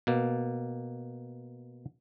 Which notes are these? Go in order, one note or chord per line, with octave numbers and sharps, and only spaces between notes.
B2 A#3